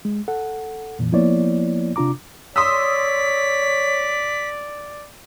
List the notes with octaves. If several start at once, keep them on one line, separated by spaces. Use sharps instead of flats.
G#3
A4 F#5
F2 A#2 E3
F3 A#3 B3 E4 C#5 D5
C3 D4 F4 A#5 D6
C#5 D5 C6 D#6 E6 B6